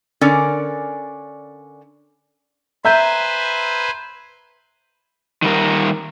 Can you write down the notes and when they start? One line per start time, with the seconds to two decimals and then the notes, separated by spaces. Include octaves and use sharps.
0.21 D3 C#4 A#4 D5 G#5
2.85 B4 C5 E5 G#5 A#5 G6
5.42 D#3 G3 A#4